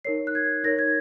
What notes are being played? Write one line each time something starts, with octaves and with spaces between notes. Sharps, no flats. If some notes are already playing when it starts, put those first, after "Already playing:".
D#4 A#4 C#5 C7
F#6
G#6
D#4 A#4 C#5 A#6
G#6